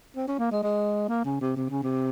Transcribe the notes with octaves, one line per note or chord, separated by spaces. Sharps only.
C4
C#4
A#3
G#3
G#3
A#3
C#3
C3
C3
C#3
C3